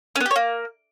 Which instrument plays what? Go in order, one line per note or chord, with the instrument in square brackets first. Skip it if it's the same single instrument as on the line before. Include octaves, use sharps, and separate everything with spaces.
[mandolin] C#4
B3
G4
C#5
A#3